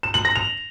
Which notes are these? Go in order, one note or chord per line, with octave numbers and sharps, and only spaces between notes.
E7
F#7
A#6
F7